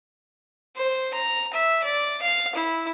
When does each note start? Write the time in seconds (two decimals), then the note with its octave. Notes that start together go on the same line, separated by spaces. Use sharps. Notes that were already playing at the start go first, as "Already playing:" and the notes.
0.76 C5
1.14 A#5
1.53 E5
1.83 D5
2.22 F5
2.55 E4